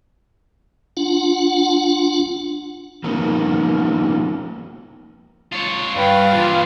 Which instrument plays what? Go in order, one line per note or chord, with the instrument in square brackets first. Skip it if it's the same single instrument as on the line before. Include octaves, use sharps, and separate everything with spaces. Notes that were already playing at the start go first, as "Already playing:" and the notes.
[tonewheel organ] D4 F4 F#5
[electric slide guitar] F3 A#3 B3 C#4 D#4
[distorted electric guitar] F4 C#5
[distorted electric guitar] G2 [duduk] B4 [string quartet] F5 [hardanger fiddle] G5
[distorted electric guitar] A#2 E3 [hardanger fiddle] F4